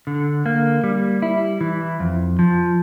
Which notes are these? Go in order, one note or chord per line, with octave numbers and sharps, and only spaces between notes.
D3
A#3
G3
E4
E3
F2
F3